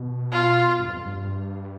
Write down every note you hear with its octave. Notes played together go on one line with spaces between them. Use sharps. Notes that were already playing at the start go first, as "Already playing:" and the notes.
Already playing: B2
F4
G2
F2
G2